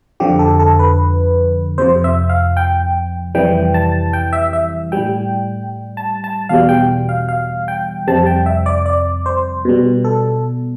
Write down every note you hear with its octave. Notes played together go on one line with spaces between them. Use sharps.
F2 D3 F3 G4
A4
A4
B4
F2 C3 F3 C5
E5
F5
G5
F2 C3 E3 G3 G5
A5
G5
E5
E5
A2 G3 G5
A5
A5
E2 B2 G3 F5
G5
F5
F5
G5
F2 C3 G3 A5
G5
E5
D5
D5
C5
B2 G3
A4